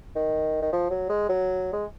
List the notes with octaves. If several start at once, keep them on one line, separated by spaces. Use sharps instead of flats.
D#3
D#3
F3
F#3
G#3
F#3
G#3